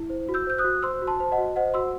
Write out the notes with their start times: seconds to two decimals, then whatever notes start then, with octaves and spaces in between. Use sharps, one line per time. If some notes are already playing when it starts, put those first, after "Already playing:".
Already playing: E4
0.10 C5
0.29 F#4
0.34 E6 G6
0.47 C5 G6
0.58 D#6 F#6
0.64 F#4
0.83 C5 C6 E6
1.02 F#4
1.07 A5 C6
1.20 C5
1.32 D#5 F#5
1.38 F#4
1.56 C5 D#5 F#5
1.74 F#4 C6 E6